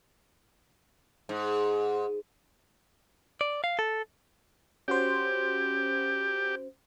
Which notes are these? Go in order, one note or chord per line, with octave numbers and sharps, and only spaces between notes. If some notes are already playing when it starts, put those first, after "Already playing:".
G#2
D5
F5
A4
C#4 F#4 G4 C5